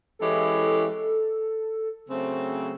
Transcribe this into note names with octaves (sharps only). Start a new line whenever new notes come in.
E3 G#3 C#4 E4 G4 A4
C#3 F#3 A3 C4